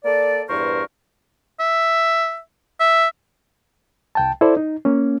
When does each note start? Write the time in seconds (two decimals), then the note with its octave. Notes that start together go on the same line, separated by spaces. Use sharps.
0.04 A#3 A4 D5
0.48 E2 G2 A#4 C5 C#6
1.60 E5
2.80 E5
4.15 C2 G5 A5
4.41 E4 A4 C5 D5
4.57 D#4
4.85 A#3 C#4